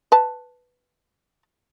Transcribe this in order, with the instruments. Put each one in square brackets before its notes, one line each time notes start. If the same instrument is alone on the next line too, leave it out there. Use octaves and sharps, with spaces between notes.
[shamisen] B4 A5